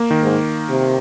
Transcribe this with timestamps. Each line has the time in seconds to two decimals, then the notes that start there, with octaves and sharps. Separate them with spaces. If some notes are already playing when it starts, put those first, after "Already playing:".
Already playing: A#3
0.11 D#3
0.22 G#2
0.70 C3